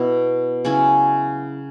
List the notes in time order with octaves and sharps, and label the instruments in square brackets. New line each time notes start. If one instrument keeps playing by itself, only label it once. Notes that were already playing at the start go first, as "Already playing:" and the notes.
Already playing: [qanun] B2 B3 E4
C#3 F#3 C#4 E4